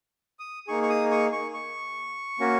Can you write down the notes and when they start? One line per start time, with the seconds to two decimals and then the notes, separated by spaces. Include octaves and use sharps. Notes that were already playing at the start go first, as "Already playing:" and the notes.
0.39 D#6
0.67 A#3 D#4 G#4 C#6
0.83 C#6
0.89 D#6
1.11 C#6
1.33 C#6
1.54 C#6
2.39 A#3 C#4 F#4